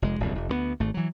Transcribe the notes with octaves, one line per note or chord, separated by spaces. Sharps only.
F1 G#3
D1 C2 F#2
F1
D2 G#3 B3
G#1 A3
E3 F#3